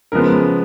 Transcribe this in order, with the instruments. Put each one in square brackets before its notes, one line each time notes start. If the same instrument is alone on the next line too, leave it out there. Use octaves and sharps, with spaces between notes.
[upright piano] C#3 F3 G#3 B3 A#4